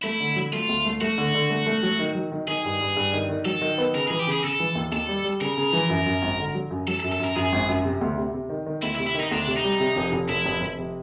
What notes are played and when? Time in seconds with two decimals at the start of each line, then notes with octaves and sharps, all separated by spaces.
0.03 A3 E4
0.20 D3
0.36 F#3
0.53 A3 F4
0.69 D2
0.85 A3
1.01 A3 F#4
1.18 D3
1.35 D3
1.50 A3
1.66 A3
1.83 F#3
1.99 D#3
2.15 F#3
2.32 D#3
2.48 D#3 G#4
2.65 G2
2.81 G2
2.97 G2
3.13 D#3
3.29 D#3
3.45 F#3 A4
3.62 D#3
3.78 B3
3.95 C#3 A#4
4.07 E3 G#4
4.19 G4
4.27 C#3 G#4
4.43 C#3 A4
4.60 E3
4.75 D#2
4.92 D#2 A4
5.08 G3
5.24 G3
5.41 C#3 A#4
5.58 C#3
5.73 E3
5.90 F#2
6.06 F#2
6.22 G#1
6.38 D3
6.55 F#3
6.71 F#2
6.88 F#3 A4
7.00 A4
7.04 F#2
7.12 A4
7.20 F#2 A#4
7.36 F#2 G#4
7.52 G#1
7.69 F#2
7.85 C3
8.01 D2
8.18 C3
8.34 C3
8.49 D#3
8.66 D#3
8.82 D2 E4
8.95 E4
8.99 C3
9.06 E4
9.15 D#3 D#4
9.31 D2 D4
9.47 C3
9.56 D#4
9.64 G3
9.80 C3
9.97 F1
10.12 F1
10.29 F1 E4
10.46 F1
10.61 F1
10.78 C3